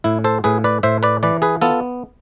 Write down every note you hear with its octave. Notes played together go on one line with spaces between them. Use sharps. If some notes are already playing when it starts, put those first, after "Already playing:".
A2 E4
A4 C5
A2 G#4 B4
B4 D5
A2 C5 E5
B4 D5
E3 B4 D5
G#4 B4
B3 F4 A4